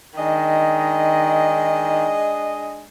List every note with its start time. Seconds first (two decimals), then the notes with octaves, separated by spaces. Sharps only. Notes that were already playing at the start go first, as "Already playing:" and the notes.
0.18 D#3 G#3 D4 D#5